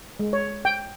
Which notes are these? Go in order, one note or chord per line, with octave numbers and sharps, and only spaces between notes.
G#3
C#5
G5